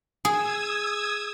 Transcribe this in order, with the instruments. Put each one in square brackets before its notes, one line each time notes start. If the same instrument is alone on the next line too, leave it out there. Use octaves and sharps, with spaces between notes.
[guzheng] G#4 [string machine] D#6 E6 G#6